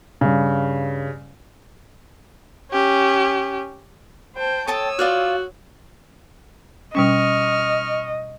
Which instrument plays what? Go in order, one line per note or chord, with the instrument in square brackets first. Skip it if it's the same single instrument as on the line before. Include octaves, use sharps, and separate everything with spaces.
[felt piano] G2 C#3
[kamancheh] C#4 G4
[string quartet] C5 G5 A5
[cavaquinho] A4 G5 A5 [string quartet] C#5 D#6 E6
[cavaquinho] F4 D5 F5 [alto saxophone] F#4
[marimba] B2 G3 C#4 [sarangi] D#5 [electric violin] C#6 F6